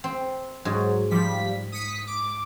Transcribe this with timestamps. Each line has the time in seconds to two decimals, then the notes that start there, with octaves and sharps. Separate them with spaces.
0.04 C4
0.65 G#2 F#3
1.11 F3 G3 B6
1.72 D#6 B6 C#7
2.07 D6